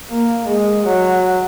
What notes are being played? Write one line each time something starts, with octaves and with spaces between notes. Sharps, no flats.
A#3
G#3
F#3